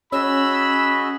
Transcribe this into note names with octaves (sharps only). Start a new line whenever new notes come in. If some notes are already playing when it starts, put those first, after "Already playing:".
C#4 F#4 G#4 D#5 B5 E6